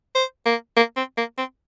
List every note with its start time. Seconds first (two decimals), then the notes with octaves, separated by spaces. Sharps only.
0.15 C5
0.46 A#3
0.76 A#3
0.96 C4
1.17 A#3
1.38 C4